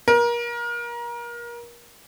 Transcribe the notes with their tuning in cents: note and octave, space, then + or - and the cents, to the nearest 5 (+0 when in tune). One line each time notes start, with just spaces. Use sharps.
A#4 +30